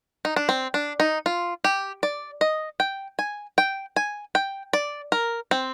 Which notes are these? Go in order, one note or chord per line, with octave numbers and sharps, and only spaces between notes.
D#4
D4
C4
D4
D#4
F4
G4
D5
D#5
G5
G#5
G5
G#5
G5
D5
A#4
C4